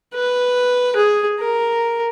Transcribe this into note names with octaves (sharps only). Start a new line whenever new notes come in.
B4
G#4
A#4